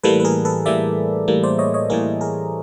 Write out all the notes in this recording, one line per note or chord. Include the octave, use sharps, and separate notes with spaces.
A2 E3 G3 A#3 A4 B4
B4
G#4 A#4
A4 B4
A2 E3 G3 A#3 D5 E5
A2 E3 G3 A#3
C5 D5
C#5 D#5
C#5 D#5
A2 E3 G3 A#3 G#4 A#4
G#4 A#4